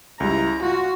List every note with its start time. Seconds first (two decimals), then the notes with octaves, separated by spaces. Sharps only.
0.20 C#2 G3 E4 A#5
0.63 F4 F#4